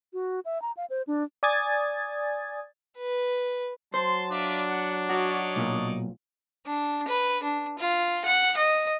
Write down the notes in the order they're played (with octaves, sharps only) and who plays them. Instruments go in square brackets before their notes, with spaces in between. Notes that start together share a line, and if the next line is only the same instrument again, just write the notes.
[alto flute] F#4
E5
A#5
F5
C5
D4
[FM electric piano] D5 G#5 D#6 G#6 A6
[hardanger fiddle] B4
[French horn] F#3 [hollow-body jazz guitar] C5 [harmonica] A5 [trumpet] C6
[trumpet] D4 [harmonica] F4 D5 E5
[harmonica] F#5
[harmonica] D#4 C#5 D5 [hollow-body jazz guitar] F#4
[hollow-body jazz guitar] B1 A#2
[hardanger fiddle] D4
B4
D4
F4
F#5
D#5